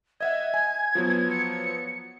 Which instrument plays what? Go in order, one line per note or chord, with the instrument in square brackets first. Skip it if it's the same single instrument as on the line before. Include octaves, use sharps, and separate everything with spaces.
[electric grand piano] D#5 E5 F#5 [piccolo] G#6
[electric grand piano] G#5
F3 F#3 B3
[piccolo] C#7